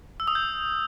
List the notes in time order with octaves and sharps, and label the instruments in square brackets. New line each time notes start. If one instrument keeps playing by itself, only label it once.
[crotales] E6
D#6
G6